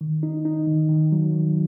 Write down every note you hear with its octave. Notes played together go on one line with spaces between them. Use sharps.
D#3
D#4
D#4
D#3
D#3
F#3
D#3